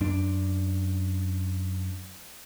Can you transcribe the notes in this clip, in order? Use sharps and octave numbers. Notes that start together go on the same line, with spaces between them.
F#2 D4